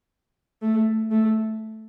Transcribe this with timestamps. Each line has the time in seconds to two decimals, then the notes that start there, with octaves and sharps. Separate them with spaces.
0.62 A3
1.11 A3